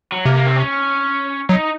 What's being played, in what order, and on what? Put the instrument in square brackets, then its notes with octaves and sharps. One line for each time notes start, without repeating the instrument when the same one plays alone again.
[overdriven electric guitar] F#3
[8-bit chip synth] C3 [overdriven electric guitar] A#3
[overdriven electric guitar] A#3
C4
C#4
[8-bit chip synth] F#3 [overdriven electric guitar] D#4